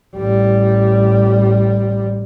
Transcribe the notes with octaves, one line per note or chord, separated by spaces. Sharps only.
A1 G3